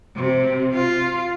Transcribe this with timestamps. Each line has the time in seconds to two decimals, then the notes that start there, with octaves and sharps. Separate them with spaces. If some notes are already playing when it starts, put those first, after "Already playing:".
0.16 C3
0.73 F4